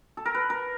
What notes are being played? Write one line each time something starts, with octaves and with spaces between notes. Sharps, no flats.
A4
A#4
B4
A#4